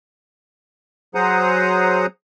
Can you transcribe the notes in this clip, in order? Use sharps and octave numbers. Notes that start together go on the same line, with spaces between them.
F#3 G#4 C5 F#5 A#5 D#6